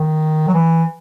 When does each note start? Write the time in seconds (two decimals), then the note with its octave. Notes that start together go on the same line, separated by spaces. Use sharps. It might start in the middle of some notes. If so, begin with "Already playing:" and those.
Already playing: D#3
0.48 F#3
0.54 E3